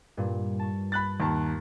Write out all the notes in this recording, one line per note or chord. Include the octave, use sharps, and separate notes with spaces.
G2 A#2
A5 C#6
B5 F#6 A6
D#2 A5 A#5 C6 C#6